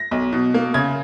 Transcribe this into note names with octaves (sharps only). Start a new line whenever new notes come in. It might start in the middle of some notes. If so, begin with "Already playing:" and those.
Already playing: A#6
B1
B2
A#3
C#3 G#6